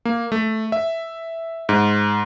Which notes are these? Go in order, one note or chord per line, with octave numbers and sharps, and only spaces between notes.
A#3
A3
E5
G#2